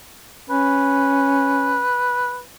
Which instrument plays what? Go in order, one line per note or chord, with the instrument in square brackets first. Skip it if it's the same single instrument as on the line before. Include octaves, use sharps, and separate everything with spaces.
[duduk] C#4 [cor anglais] B4